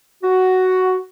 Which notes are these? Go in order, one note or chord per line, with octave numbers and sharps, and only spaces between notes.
F#4